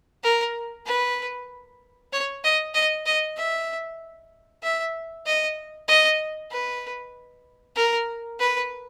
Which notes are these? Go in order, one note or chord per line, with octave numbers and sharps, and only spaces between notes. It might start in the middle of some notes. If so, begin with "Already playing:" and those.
A#4
B4
C#5
D#5
D#5
D#5
E5
E5
D#5
D#5
B4
A#4
B4